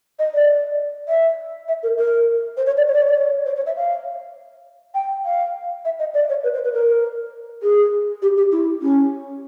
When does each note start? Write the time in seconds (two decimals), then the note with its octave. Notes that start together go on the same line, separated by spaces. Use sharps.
0.19 D#5
0.34 D5
1.08 E5
1.68 E5
1.83 A#4
1.98 A#4
2.57 C5
2.66 C#5
2.77 D5
2.87 C#5
2.94 D5
3.02 C#5
3.08 D5
3.16 C#5
3.46 C5
3.56 C#5
3.66 E5
3.76 F5
4.94 G5
5.25 F5
5.85 E5
5.99 D#5
6.14 D5
6.29 C#5
6.43 B4
6.54 C5
6.64 B4
6.73 A#4
7.63 G#4
8.22 G4
8.37 G4
8.52 E4
8.82 C#4